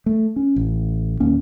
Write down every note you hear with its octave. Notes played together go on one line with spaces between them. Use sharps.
A3
C#4
A1
D#1 D#2 A#3 C#4